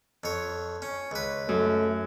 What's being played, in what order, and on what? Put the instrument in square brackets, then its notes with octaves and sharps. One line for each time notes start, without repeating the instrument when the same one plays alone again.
[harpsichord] F2 C#5
C#4
C#2 B4
[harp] F#2 [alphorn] A3